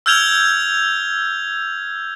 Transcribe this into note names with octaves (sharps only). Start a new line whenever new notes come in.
E6 F6 G6 G#6 F7 G7